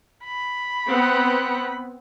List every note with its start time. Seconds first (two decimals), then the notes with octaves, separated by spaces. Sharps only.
0.24 B5
0.88 B3 C4 F#5